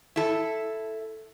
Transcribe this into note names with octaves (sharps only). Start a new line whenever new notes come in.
E4 A4